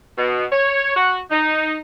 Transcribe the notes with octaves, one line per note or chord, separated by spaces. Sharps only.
B2
C#5
F#4
D#4